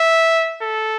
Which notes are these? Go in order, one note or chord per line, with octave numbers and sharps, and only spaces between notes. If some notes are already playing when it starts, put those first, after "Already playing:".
Already playing: E5
A4